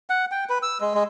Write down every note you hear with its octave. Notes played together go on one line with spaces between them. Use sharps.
F#5
G5
B4
E6
G#3
G#3